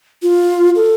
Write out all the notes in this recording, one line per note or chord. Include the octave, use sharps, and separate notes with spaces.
F4
A4